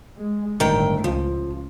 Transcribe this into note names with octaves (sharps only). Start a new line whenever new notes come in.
G#3
G1 A2 D#3 A3 G5
C#2 F3